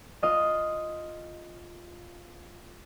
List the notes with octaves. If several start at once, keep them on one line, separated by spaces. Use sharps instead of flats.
F4 D#5 F5